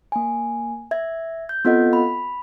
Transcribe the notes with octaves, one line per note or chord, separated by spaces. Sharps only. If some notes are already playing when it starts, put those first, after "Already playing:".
A#3 G#5
E5 G#6
G6
B3 C4 F4 A4 D#5 F#5
B5